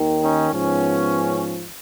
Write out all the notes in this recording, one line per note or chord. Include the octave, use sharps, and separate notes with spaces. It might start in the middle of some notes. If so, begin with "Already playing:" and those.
Already playing: D#2 D#3
C#4 D#4
G#2 F3 B3 C#4